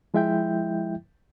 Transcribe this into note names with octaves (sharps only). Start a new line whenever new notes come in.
F3 G#3 E4 E5 G5 G6